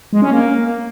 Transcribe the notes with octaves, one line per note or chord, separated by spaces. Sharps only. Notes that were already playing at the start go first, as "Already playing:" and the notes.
G#3
C#4
A#3